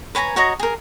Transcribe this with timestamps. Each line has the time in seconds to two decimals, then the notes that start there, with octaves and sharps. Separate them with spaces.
0.15 B4 C#5 G#5 A#5
0.36 F#4 C#5 D#5 A#5
0.59 G#4 A#4